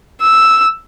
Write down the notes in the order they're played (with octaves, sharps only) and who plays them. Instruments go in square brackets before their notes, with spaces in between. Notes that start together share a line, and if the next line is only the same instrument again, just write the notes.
[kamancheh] E6